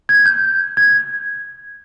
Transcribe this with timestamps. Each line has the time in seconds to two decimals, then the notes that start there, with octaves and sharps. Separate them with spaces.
0.09 G#6
0.26 G6
0.77 G#6